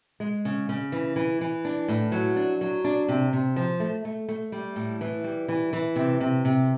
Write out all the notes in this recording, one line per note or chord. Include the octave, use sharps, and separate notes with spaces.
G#3
C#3
C#3
E3
E3
E3
D4
A2
F#3
D4
F#3
D4
C3
C3
F3
A3
A3
A3
G3
A2
E3
G3
E3
E3
C3
C3
C3